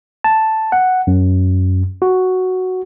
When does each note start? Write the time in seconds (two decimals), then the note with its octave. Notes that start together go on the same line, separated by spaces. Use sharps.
0.24 A5
0.72 F#5
1.07 F#2
2.02 F#4